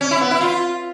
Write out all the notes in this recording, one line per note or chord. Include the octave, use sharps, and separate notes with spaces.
C#4
E4
B3
E4
F4